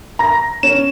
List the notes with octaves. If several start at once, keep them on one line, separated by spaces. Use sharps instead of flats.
A#5 A#6
C#4 E7